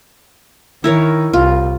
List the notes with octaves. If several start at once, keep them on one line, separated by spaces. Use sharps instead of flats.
D#3 E4 A#4 C#5
C2 F4